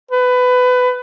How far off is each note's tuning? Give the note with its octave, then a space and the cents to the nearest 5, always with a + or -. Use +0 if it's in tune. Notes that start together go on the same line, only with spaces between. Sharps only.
B4 +20